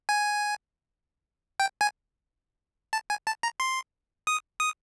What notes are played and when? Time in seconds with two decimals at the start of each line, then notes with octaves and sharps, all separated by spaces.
0.09 G#5
1.60 G5
1.81 G#5
2.93 A5
3.10 G#5
3.27 A5
3.43 A#5
3.60 C6
4.27 D#6
4.60 D#6